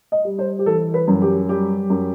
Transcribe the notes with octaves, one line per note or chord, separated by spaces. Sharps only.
D#5
G3
C5
G4
E3 A4
B4
F#2
G4
G3 G4
F#2